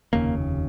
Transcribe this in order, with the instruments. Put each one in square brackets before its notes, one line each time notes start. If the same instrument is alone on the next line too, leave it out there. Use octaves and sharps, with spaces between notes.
[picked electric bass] F1 D#2 C#3 A#3